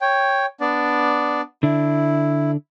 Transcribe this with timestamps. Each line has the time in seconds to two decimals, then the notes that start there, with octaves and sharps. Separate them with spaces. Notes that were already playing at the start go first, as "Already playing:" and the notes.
0.01 C#5 G5
0.61 B3 D4 D5
1.63 D3 D4 E4